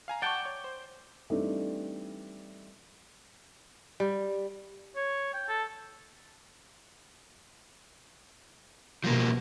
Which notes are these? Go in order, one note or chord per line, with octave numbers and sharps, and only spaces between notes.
F5 G#5 A#5
D5 F#5 G5 A5 C#6
C#5 C#6
C5
E3 G3 A3 C4 D4 D#4
G3
C#5
G5
A4
B2 F3 G3 A#3